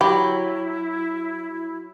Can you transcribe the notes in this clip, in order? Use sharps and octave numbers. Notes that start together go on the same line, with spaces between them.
F#3 E4 G4 B5